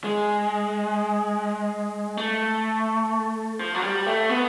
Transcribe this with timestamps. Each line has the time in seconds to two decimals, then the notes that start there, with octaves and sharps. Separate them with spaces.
0.04 G#3
2.17 A3
3.59 F3
3.75 F#3
3.82 G3
4.07 A3
4.29 B3